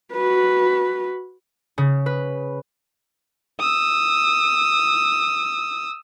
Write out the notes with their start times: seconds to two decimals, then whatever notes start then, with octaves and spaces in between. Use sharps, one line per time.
0.12 F#4 B4
1.78 C#3
2.06 B4
3.60 D#6 E6